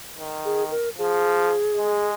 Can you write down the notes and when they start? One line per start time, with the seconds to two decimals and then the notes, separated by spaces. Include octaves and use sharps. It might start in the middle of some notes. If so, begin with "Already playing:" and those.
0.18 D#3
0.45 G#4
0.71 A#4
0.98 F3 G#4
1.77 G#3